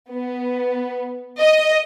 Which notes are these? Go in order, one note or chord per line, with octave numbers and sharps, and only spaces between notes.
B3
D#5